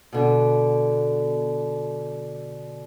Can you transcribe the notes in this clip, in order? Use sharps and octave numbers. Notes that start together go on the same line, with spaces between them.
B2 D3